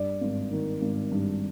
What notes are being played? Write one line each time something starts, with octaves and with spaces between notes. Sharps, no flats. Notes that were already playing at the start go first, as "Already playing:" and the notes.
Already playing: G2 D5
G#1
D#3
G#1
G2